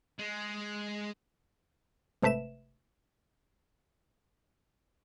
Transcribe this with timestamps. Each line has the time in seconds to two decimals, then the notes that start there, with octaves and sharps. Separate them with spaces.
0.18 G#3
2.22 G#1 C3 A3 B4 E5 E7